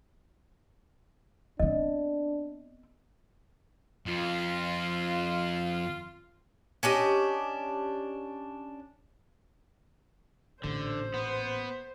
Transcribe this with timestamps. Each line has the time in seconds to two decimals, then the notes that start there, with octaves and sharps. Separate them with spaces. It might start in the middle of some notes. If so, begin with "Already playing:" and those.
1.60 B3 C4 D4 D#5
4.06 F2 F4
6.83 C#4 D4 G4 D#5
10.64 A1 A#2 D3 C5
11.14 B3